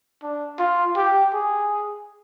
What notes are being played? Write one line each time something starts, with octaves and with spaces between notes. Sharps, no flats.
D4
F4
G4
G#4